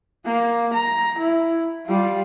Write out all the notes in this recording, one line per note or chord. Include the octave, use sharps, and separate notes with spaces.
A#3
A#5
E4
G3 F4